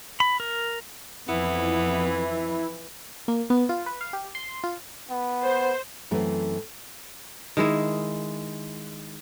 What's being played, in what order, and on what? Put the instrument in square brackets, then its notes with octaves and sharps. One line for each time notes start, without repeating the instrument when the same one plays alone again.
[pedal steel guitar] B5
A#4
[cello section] F2 [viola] E3 [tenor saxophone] B3 [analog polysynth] E4
[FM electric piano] A#3
B3
F4
B4
F5
G4
C6
F4
[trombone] B3
[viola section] C5
[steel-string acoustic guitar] F#2 E3 A3 C4
[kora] D#3 G#3 E4